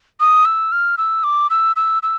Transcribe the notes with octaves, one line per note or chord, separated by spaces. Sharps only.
D#6
E6
F6
E6
D6
E6
E6
E6